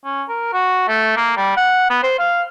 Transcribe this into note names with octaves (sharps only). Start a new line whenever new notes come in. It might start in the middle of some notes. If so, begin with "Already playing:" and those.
C#4
A#4
F#4
A3
A#3
G3
F#5
B3
C5
F5